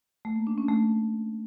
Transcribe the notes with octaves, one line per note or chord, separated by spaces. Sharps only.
A3
A#3
D4
C#4
A3